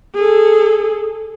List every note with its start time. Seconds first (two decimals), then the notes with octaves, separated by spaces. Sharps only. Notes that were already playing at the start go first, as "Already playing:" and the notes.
0.15 G#4 A4